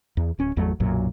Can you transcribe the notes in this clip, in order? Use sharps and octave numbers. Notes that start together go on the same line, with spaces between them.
E2
D1 C#4
G#1 E2 F#3 A3
B1 F#2 A#2 F#3